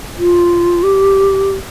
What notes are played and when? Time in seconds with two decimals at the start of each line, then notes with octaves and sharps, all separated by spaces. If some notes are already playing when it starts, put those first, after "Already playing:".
0.18 F4
0.83 G4